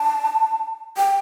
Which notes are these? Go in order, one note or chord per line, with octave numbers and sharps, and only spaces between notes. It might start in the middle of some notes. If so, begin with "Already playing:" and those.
Already playing: A5
G5